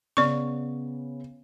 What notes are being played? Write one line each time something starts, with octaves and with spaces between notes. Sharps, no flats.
C#3 B3 D5 C#6